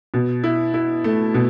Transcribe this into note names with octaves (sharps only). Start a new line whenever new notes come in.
B2
E4
E4
A3
B2